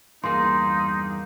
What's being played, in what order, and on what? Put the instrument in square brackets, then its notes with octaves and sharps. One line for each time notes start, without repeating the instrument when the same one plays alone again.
[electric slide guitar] E2 G2 G#4 [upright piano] A#3 [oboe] D#4 [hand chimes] C6